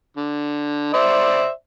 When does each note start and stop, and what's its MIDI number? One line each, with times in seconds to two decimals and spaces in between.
0.17 0.90 50
0.94 1.49 72
0.94 1.49 74
0.94 1.49 76